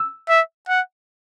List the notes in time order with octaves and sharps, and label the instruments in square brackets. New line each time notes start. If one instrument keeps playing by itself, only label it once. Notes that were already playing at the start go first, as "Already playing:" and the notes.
Already playing: [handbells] E6
[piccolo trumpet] E5
F#5